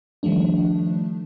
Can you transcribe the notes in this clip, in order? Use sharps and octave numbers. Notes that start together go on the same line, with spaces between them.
D#3 F3 G3 A3 D4